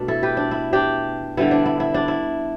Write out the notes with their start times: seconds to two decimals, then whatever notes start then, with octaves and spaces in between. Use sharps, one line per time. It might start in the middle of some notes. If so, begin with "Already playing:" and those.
Already playing: B2 A3 D4
0.08 E4 A4
0.23 G4 B4
0.37 D4
0.51 E4
0.73 D4 G4
1.37 D3 G3 B3 E4
1.51 D4
1.66 E4
1.80 E4
1.94 D4
2.08 E4